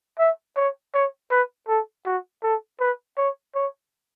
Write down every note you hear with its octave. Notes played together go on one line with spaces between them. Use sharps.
E5
C#5
C#5
B4
A4
F#4
A4
B4
C#5
C#5